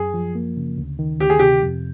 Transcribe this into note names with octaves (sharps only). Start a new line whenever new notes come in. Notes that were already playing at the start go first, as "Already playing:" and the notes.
Already playing: F#2 G#4
F3
A#3
C#3
D2
D#3
D2 G4
G#4
C3 G4
F2